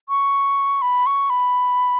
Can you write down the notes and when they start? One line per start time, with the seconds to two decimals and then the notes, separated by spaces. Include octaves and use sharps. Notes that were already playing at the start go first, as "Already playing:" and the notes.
0.09 C#6
0.82 B5
1.06 C#6
1.30 B5